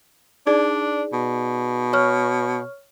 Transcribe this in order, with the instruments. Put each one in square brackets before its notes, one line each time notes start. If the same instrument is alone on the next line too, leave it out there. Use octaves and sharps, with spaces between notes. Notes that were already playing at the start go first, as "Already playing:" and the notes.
[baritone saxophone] D4 [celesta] D#4 G#4 D5
[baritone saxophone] B2
[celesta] C#5 C#6 F6